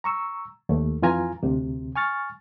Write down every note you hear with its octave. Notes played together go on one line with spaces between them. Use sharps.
A#5 C#6 E6
D#2 A3
F2 E3 F4 G#5 A#5
D2 C3
G#5 C#6 F6 A6